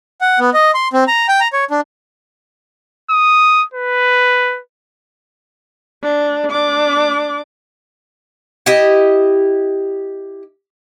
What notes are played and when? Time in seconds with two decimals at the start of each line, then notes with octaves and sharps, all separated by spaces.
0.21 F#5
0.39 B3
0.54 D#5
0.74 C6
0.93 C4
1.08 A#5
1.28 G5
1.40 A#5
1.53 C#5
1.71 D4
3.10 D#6
3.74 B4
6.03 D4
6.51 D4 D6
8.66 E4 G4 D#5